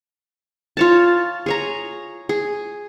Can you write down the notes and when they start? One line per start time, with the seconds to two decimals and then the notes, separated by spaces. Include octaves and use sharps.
0.77 F4 C#5 A5
1.46 G#4 C#5 A#5
2.29 G#4